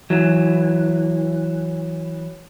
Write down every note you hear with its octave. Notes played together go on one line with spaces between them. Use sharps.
E3 F#3